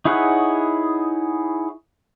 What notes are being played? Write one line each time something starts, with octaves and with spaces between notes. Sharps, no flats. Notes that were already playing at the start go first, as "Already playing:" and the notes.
D#4 E4 G#4 C#5 F#5